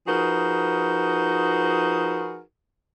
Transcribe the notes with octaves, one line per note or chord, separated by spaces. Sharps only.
F3 D#4 F#4 G#4 A#4 B4